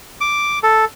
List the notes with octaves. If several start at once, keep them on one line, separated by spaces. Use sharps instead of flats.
D6
A4